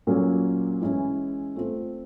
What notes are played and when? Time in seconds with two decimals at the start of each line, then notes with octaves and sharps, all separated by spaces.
0.07 A#2 F#3 A#3 C#4
0.82 E3 G#3 C#4 E4
1.56 A3 C4 F4